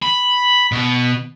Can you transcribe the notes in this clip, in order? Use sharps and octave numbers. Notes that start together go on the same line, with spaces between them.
B5
B2